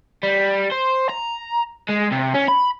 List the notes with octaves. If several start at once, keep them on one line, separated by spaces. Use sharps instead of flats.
G3
C5
A#5
G#3
C3
C#4
B5